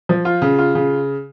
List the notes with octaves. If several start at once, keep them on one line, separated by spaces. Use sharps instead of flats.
F3
F4
C#3
F4
C#3